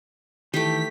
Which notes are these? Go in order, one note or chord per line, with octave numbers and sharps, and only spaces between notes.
D#3 E3 A3 G4 B6